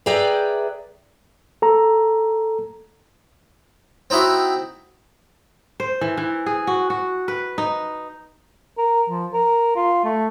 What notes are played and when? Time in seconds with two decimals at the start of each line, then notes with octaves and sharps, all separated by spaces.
0.06 G#4 B4 D5 E5 G5 A#5
1.62 A4 A#5
4.10 C4 D#4 E4 F#4 E5
5.80 C5
6.01 E3
6.17 E3
6.46 G#4
6.67 F#4
6.90 F#4
7.28 B4
7.58 D#4
8.78 A#4
9.10 F3
9.33 A#4
9.76 F4
10.05 A3